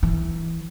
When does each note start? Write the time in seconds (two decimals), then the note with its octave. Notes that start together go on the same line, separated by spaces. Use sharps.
0.03 E3